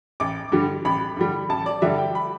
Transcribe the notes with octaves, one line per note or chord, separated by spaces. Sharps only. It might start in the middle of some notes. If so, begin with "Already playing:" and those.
A1 D6
G2 D3 G3
A1 B5
G2 D3 G3
A1 A5
D5
G2 D3 G3 E5
G5
B5